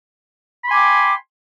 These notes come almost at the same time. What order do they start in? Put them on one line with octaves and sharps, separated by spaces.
B5 C6 G#5 D6 G5